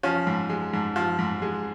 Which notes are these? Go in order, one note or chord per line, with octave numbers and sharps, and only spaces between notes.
F3 C#4
G#2
G#3
G#2
F3
G#2
G#3